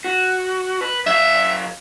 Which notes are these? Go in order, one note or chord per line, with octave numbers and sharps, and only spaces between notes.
F#4
B4
F#2 E5 F5